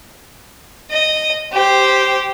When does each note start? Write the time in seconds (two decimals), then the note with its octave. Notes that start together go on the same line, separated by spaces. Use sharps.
0.91 D#5
1.52 G4 C5